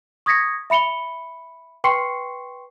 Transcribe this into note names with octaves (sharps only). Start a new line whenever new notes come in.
C#6 D#6 G#6 A#6 B6 C#7
E5 B5 C#7 F7 G7
B4 G5 C6 C#6 C7 C#7